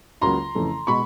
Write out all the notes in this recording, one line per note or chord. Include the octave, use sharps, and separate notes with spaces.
C#2 C#3 F#3 A#3 A#5 C6
F2 C#3 E3 A3
B2 G#3 B5 C#6